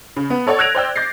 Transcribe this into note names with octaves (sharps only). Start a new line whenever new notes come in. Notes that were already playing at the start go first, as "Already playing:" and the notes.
C#3
B3
A4 C#5 D5 F#5
E6 F#6 G#6 A#6 D7 F7
C5 D5 G5 E6
D6 G6 A6 A#6 C7